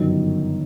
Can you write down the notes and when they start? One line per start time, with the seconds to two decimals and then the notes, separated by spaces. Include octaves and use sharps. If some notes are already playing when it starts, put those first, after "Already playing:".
Already playing: G1 F#2 D#3